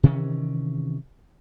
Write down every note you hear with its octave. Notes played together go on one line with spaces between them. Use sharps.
C3 D#3 E3 C#4